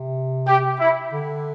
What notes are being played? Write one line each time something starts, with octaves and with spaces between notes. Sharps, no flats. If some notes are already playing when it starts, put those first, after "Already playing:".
Already playing: C3
G4
E4
D3